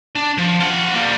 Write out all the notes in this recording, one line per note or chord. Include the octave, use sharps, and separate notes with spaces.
D4
F3
F4 F#5
G3 A#3